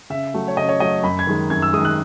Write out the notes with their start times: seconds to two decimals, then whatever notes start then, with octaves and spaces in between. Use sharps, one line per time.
0.10 C#3 E5
0.34 F#3 A3
0.48 C#5
0.57 C#3 D#5
0.69 C#5
0.80 F#3 A3 D#5
1.03 F#2 B5
1.19 G#6
1.27 D#3 G#3
1.50 F#2 G#6
1.62 E6
1.73 D#3 G#3 D#6
1.85 F#6